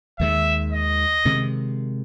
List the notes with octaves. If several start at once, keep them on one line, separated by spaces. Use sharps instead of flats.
D#2 D#3 G#3 E5
D#5
C3 D#3 G#3